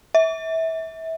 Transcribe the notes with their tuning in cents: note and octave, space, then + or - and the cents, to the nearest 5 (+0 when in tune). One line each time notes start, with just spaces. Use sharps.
E5 -25